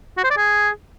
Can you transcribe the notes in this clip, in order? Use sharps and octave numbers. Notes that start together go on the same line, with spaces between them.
F#4
C5
D5
G#4